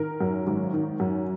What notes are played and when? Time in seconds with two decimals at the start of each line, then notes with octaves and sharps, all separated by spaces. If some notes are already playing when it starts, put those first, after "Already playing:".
Already playing: D#3 A#4
0.21 F#2
0.47 G#1
0.73 D#3
1.00 F#2